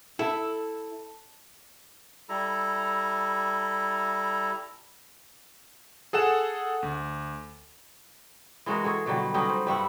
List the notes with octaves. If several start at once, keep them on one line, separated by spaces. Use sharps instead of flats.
E4 A4
G3 E4 A4 A#5
G#4 A4 F#5 E7
D2
E3 G#3 F#4 A#4
G#4 A4 C#5
B2 D3 F#3 G3
F#3 G3 C#4 D#4
C5
G2 G3 E5 F#5